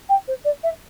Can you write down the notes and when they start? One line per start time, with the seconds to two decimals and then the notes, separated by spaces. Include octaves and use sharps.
0.09 G5
0.28 C5
0.45 D5
0.63 E5